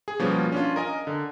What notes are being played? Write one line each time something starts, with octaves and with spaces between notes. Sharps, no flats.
G#4
B2 F3 G3 A#3 B3 C#4
C#4 D4 F4
A#4 D#5 G#5
D3